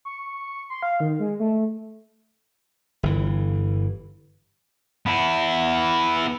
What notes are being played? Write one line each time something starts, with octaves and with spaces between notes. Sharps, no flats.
C#6
C6
F5
D#3
G#3
A3
G1 E3
B3 E4